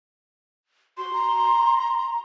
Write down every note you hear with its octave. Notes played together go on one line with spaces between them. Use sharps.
F#4 C6
A#5